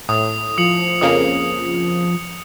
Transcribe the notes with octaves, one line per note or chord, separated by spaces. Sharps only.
A2 D#6
F3 D#6 C#7 F#7
F2 C#3 A#3 D#6